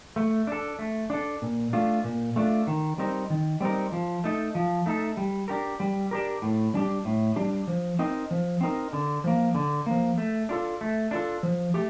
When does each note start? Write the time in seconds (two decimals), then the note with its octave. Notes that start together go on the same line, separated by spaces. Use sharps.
0.16 A3
0.47 D4 A4
0.79 A3
1.10 D4 A4
1.42 A#2
1.73 A3 D4 F4
2.04 A#2
2.36 A3 D4 F4
2.67 D#3
2.98 G3 C4 D#4 A#4
3.30 D#3
3.61 G3 C4 D#4 A#4
3.92 F3
4.24 A3 D#4 A4
4.55 F3
4.86 A3 D#4 A4
5.17 G3
5.48 D4 G4 A#4
5.80 G3
6.11 D4 G4 A#4
6.42 A2
6.74 G3 D4 G4
7.05 A2
7.36 G3 D4 G4
7.68 F3
7.99 C4 D#4 A#4
8.31 F3
8.61 C4 D#4 A#4
8.93 D3
9.24 F3 A#3
9.55 D3
9.86 F3 A#3
10.18 A3
10.49 D4 F4 A4
10.81 A3
11.11 D4 F4 A4
11.43 F3
11.74 A3 G4